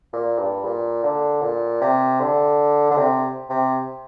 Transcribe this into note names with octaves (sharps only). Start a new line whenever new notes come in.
A#2
G2
A#2
D3
A#2
C3
D3
D3
C3
C3